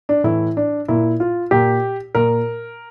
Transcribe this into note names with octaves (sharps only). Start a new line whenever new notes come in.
D4
A2 E3 E4
D4
A#2 E4
F4
A#2 G4
A#2 A#4